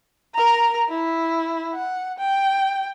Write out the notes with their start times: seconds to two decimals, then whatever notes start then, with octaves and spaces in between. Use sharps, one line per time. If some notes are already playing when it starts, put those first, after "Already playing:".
0.35 A#4 A#5
0.89 E4
1.74 F#5
2.18 G5